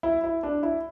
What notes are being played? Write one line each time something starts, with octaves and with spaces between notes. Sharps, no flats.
E4
E4
D4
E4